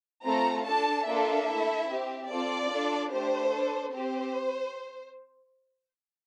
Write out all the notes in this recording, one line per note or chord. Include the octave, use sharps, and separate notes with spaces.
A3 C4 F4 A4 A#5
D4 A4 A5
A#3 D4 F4 A4 E5
A3 E4 A4
C4 G4
C4 F4 A4 D5
D4 F4 A4
A3 D4 G4 C5
D4 A4
C4 G4 C5